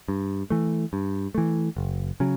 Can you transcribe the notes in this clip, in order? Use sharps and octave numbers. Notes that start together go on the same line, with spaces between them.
G2
E3 A3
G2
E3 A3
F#1
C#3 F#3